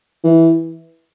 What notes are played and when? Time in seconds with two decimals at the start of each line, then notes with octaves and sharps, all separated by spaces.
0.23 E3